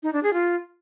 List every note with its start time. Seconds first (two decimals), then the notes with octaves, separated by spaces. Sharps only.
0.03 D#4
0.13 D4
0.23 G#4
0.33 F4